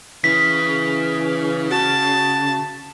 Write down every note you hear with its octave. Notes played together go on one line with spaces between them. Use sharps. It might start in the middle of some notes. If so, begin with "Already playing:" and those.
C#3 E3 B6
F#4 A5